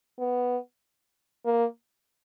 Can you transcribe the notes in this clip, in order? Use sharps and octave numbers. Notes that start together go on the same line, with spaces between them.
B3
A#3